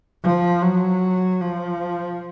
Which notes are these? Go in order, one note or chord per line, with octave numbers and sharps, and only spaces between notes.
F3
F#3
F3